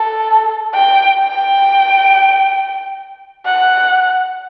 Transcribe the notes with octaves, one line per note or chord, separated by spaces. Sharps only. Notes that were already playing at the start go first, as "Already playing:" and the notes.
Already playing: A4
G5
G5
F#5